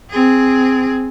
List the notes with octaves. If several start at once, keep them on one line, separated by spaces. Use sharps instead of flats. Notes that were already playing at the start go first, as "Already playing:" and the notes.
C4 G#4